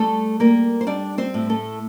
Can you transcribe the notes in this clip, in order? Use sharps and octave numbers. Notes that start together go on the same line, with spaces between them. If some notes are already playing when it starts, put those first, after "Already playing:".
Already playing: G3 A3 A4
G3 A#3 A#4
C5
G3 D4 D5
C4 C5
A2
A3 A4